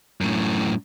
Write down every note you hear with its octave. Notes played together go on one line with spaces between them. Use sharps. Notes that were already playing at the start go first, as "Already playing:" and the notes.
F#2 A2